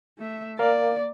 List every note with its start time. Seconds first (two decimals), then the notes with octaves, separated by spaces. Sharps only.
0.18 A3 E5
0.59 A#3 A#4 D5 F5